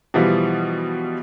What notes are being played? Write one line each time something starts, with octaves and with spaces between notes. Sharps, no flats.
B2 E3 F3 G3